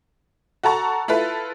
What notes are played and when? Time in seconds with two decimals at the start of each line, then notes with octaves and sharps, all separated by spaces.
0.63 F#4 A4 A5 A#5 C#6
1.08 E4 F4 A4 B4